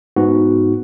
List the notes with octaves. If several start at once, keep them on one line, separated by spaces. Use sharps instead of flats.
G#2 B3 D#4 F#4